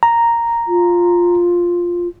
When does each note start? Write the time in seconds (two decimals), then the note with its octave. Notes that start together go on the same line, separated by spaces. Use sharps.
0.03 A#5
0.68 F4